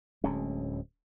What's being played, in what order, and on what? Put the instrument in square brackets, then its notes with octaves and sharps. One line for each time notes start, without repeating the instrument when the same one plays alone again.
[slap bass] D1 D2 G#3 C#4